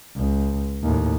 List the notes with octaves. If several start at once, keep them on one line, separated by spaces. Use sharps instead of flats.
C#2
D#2 A2